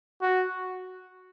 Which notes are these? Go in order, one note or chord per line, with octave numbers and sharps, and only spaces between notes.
F#4